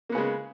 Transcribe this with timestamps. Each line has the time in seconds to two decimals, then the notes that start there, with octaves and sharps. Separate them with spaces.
0.09 A#3
0.12 B3
0.15 C#3
0.18 G#3